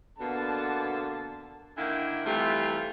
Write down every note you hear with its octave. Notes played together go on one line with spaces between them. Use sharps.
B2 D3 A#3 B3 A5
D3 D#3 A#3 E4 G5 G#5
C3 E3 G3 A3 F4 A4